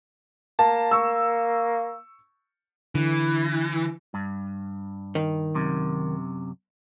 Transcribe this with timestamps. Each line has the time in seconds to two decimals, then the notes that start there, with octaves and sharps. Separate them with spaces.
0.59 A#3 A5
0.91 C#6 E6
2.95 D3 E3
4.14 G2
5.15 D#3
5.55 F#2 C3